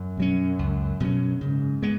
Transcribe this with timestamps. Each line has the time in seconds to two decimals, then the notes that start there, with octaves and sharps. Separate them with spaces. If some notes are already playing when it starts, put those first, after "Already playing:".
Already playing: F#2
0.17 B2 F#3 C#4
0.59 C#2
1.00 B2 F#3 C#4
1.41 G#2 C#3
1.83 G#3 B3